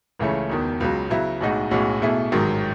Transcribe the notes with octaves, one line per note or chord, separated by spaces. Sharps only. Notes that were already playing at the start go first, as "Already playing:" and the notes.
C#2 C#3 E3 A3 C#4
E1 E2 D#3
C#2 C#3 F#3
C#3 F#3 B3 E4
B1 A2 G#3 D#4 F#4
B1 A2 G#3 C#4 F#4
B1 B2 A3 E4 G#4
A1 G#2 D#3 F#3